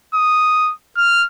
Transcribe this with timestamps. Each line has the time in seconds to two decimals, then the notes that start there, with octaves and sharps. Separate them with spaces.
0.14 D#6
0.97 F6